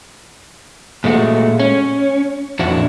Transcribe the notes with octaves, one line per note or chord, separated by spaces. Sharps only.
A#2 G#3 A3 F#4
C#4
F2 A#2 D4 E4 F#4